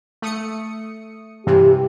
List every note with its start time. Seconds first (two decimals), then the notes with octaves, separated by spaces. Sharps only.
0.22 A3 D#6 C#7
1.47 G2 C3 E3 G4